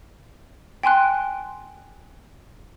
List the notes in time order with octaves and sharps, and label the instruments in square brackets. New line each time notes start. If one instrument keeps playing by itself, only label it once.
[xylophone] G5 G#5 C6 F#6